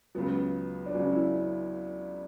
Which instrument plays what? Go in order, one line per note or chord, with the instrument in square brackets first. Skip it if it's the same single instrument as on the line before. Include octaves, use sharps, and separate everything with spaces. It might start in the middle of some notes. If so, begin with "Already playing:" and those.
[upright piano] C#2 C#3 F#3 B3
D4
C#2 C#3 F#3 C#4
E4